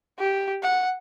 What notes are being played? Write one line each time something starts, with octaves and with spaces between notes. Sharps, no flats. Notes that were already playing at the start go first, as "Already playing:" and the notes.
G4
F#5